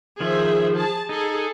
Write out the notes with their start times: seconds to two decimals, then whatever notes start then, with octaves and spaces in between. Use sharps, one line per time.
0.21 D#3 F3 G#4 C5 E5
0.76 G#4 A5
1.09 D#4 G#4 A4